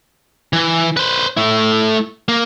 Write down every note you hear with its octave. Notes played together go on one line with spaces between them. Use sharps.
E3
B4 C5
A3 E4
A#3